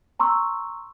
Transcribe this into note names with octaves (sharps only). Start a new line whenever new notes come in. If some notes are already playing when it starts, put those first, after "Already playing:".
A#5 C6 C#6 E6